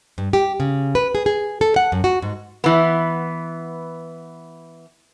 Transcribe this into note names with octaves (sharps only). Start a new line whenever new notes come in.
G2
G4
C#3
B4
G#4
G#4
A4
F#5
F#2
F#4
G#2
E3 B3